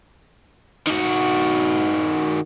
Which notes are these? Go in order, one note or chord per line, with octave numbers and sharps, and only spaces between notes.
D#3 F#4